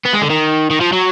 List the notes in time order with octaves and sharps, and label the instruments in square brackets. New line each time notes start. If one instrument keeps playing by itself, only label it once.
[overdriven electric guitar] B3
G#3
D3
D#3
D#3
F3
F#3